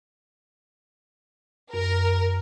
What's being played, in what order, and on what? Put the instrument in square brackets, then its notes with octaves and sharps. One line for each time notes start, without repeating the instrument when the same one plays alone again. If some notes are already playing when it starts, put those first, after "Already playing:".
[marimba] F#2 [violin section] A#4